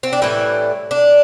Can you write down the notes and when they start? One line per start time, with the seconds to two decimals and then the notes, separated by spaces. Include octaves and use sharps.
0.03 C4
0.13 D4
0.22 A2 E3 G3 E4
0.91 D4